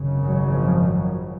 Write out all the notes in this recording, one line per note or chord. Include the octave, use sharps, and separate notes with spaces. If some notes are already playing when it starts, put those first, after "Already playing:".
Already playing: G#1 F#2 C#3
F#3
F3
F#3